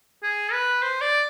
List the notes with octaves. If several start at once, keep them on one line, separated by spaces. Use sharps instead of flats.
G#4
B4
C5
D5